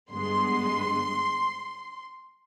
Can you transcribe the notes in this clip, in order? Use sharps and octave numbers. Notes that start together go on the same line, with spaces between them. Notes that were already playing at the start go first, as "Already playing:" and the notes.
G2 D3 G#3 B3 C6